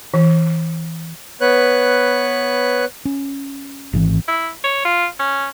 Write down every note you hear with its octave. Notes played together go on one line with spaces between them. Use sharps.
E3
B3 B4 C#5 F#6
C#4
G#1 G#2 E3 C4
E4
C#5
F4
C#4